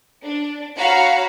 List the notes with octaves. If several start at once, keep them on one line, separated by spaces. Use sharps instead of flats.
D4
F#4 C#5 F5 A#5 B5